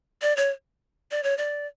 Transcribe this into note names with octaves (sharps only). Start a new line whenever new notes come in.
D5
C#5
D5
C#5
D5